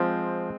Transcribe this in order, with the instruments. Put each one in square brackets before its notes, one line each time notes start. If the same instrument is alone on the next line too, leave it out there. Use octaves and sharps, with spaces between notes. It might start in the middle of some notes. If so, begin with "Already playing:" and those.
Already playing: [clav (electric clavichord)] F3 [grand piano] G#3 C4